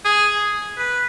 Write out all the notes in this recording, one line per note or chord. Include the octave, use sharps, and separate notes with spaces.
G#4
B4